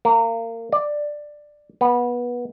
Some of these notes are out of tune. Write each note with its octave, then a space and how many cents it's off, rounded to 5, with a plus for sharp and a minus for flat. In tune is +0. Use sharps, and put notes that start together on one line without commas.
A#3 -30
D5 +10
B3 -20